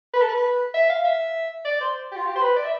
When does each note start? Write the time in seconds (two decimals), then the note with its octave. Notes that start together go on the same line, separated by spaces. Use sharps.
0.14 B4
0.21 A4
0.29 B4
0.74 E5
0.90 F5
1.05 E5
1.65 D5
1.81 C5
2.12 G4
2.16 F4
2.26 G4
2.36 C5
2.42 B4
2.56 D5
2.65 E5